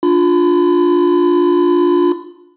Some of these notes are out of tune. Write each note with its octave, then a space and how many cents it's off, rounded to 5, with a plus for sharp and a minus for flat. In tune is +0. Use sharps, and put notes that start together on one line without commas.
D4 +5 F4 +15 B5 +35